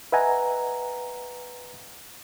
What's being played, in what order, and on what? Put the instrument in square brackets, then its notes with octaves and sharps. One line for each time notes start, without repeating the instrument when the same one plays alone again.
[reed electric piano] B4 D#5 E5 F#5 G#5 A#5